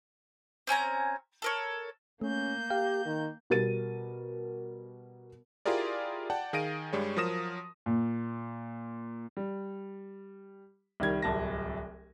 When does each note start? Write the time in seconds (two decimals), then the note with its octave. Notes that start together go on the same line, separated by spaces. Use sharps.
0.67 C4 C#4 G#5 A#5
1.42 A4 A#4 C#5
2.21 A3 A#3 C#4 G6
2.70 G4 F5 G5
3.06 D#3
3.50 B2 G3 A#4 A6 D#7
5.66 E4 F4 G4 G#4 A#4 D5
6.30 D5 F#5 G5 A5
6.53 D#3 G#4 F5 A#6 D7 D#7
6.93 G2 G3 G#3 C#5
7.16 F3 F#3 A#4 D#6 A#6 E7
7.86 A#2
9.37 G3
11.00 C2 D#3 G3 G#6
11.22 D1 C2 A5 A#6